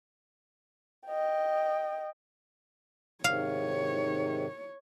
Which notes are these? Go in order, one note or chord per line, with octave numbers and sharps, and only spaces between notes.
D#5 G5
G#2 C3 D#3 C#5 F5